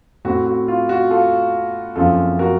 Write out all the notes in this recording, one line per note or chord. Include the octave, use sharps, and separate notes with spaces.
A2 A3 C4 F#4
F#4
F4
F#4
F4 A4
F#1 F#2 F3 C4 F4 A4
F#4 A#4